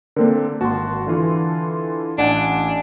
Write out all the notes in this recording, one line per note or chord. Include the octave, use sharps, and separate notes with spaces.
D3 A#3 C4 D4 A#4
G#1 A#3 F#4 A5 C6
D3 E3 F4
A1 D4 F#5 G#5